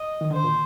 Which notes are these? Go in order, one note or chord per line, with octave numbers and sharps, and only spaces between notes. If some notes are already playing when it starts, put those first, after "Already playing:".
Already playing: D#5
D#3
D3 C5
A#2